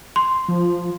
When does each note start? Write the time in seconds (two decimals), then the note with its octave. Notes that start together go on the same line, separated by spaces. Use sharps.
0.16 C6
0.48 F3